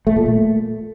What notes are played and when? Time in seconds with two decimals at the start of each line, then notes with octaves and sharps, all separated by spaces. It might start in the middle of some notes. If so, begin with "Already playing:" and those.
0.07 A3
0.16 A#2
0.26 A3